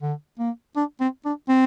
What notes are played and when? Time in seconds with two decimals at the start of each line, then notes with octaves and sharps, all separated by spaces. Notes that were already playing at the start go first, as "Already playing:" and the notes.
0.02 D3
0.39 A#3
0.76 D4
1.00 C4
1.25 D4
1.49 C4